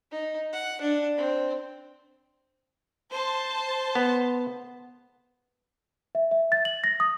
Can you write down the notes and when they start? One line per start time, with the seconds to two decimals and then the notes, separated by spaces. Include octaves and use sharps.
0.11 D#4
0.53 F#5
0.81 D4
1.17 C4
3.11 C5 A5
3.95 B3
6.15 E5
6.31 E5
6.52 A6
6.65 F#7
6.84 A#6
7.00 D#6